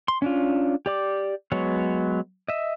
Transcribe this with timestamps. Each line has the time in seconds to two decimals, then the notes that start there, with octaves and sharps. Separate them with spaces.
0.08 C6
0.22 C#4 D4 F4
0.86 G4 D5 D6
1.52 F#3 G#3 B3 C#5
2.48 D#5 E5